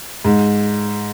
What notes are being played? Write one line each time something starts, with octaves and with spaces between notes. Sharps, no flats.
G#2